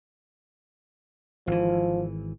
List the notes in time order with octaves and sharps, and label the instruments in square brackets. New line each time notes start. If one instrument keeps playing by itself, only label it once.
[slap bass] G#1 E3 [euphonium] F3